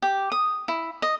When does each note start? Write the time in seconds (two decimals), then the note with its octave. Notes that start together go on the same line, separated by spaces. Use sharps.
0.02 G4
0.32 D#6
0.68 E4
1.02 D#5